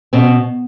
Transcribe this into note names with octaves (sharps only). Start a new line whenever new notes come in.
B2 C4